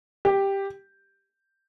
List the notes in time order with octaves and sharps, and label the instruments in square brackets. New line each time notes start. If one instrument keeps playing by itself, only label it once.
[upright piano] G4